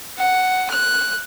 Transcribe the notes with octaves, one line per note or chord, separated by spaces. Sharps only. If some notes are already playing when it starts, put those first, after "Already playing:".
F#5
F#6